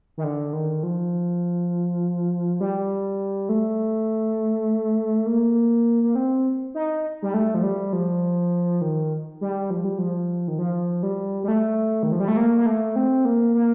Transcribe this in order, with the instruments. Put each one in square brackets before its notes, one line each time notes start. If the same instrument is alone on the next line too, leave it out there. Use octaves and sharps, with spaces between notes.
[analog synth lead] D#3
D3
D#3
F3
G3
A3
A#3
A#3
C4
D#4
G3
A3
F3
G3
F3
D#3
G3
F3
G3
F3
D#3
F3
G3
G3
A3
D#3
F3
G3
A3
A#3
A#3
A3
C4
A#3
A#3